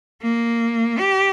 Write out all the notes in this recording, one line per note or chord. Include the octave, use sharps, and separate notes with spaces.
A#3
G4